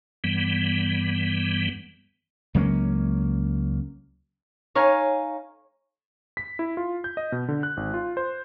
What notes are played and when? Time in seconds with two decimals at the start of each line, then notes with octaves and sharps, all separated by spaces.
0.24 G2 E3 G3 B3
2.54 C#2 F#3 A#3 C#4
4.75 D#4 C#5 F5 G#5
6.37 B6
6.59 E4
6.77 F4
7.04 G6
7.17 D#5
7.32 B2
7.48 D3
7.63 F#6
7.77 G#1
7.94 F4
8.17 C5